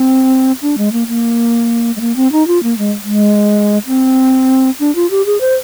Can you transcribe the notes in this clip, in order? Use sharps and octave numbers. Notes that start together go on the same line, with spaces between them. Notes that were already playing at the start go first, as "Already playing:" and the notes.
Already playing: C4
D4
G#3
A#3
A#3
G#3
A#3
C4
D#4
F4
A#3
G#3
G#3
C4
D4
F4
G4
G#4
C5